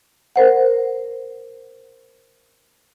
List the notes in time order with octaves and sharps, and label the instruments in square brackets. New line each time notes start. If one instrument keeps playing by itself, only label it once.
[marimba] A#4 C5 F#5